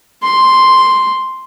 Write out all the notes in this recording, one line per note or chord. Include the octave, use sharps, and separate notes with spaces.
C6